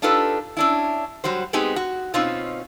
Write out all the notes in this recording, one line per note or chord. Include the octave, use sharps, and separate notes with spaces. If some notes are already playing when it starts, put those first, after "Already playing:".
D4 D#4 F4 G4 A4 B4
C#4 D4 E4
F#3 G3 F#4 C5
G#3 B3 C4 D#4 G4 G#4
F#4
B2 C4 C#4 D#4 F4